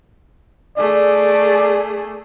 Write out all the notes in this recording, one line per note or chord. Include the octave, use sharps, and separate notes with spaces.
A3 G#4 D5